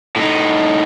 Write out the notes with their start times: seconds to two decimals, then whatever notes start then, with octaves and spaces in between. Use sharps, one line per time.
0.16 A2 D#4